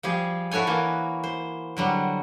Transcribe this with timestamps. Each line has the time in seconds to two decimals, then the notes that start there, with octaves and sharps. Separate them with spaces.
0.03 F3 G3 G4 G#4
0.51 E4 F#4 A4 C#5 G#5
0.67 E3 A#3 F#4
1.24 C5
1.77 D3 F#3 G3